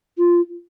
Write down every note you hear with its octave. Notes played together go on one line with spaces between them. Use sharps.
F4